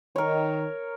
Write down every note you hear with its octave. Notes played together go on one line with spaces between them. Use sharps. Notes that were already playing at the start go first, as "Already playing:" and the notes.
D#3 A#4 C#5